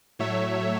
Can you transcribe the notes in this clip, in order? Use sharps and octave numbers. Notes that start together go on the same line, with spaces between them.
A2 F#3 A3 C#5 E5